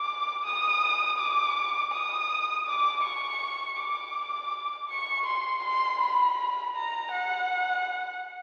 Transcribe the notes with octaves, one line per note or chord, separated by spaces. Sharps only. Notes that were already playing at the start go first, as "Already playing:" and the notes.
Already playing: D6
D#6
D6
D#6
D6
C#6
D6
C#6
C6
C6
B5
A#5
F#5